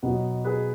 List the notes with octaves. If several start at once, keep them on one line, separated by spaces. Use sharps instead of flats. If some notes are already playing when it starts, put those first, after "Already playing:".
B2 F#3 B3 D#4
G#4 B4